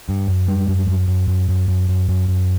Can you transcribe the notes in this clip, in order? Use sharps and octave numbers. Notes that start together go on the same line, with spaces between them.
G2
F#2
G3
F#2
F#2
F#2
F#2
F#2
F#2
F#2
F#2
F#2